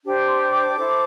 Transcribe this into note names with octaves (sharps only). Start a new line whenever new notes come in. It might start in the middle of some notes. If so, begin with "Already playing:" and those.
D4 G4 C5
C6
D6
E4 A4 C5